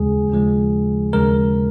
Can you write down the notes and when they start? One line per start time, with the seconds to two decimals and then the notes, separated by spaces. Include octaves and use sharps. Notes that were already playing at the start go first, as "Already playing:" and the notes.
Already playing: D#2 C#3 F3 G#3 G#4
0.30 D#2 C#3 F3 G#3
1.13 D#2 C#3 F3 G#3 A#4